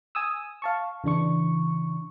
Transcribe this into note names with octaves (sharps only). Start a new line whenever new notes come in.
G#5 D#6 E6
F5 A5 C#6
C#3 E3 D4 C#6